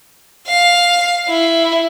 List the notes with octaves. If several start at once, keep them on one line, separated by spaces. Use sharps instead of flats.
F5
E4